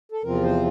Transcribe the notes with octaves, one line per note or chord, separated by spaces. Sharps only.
A4
E2 C3 F3 C4 F4 A#4
C5